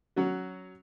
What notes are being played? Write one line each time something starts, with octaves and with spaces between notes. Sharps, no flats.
F#3 C#4 F#4